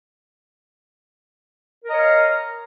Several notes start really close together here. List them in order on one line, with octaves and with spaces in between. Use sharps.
A#4 A#5 D#5 C#5 F5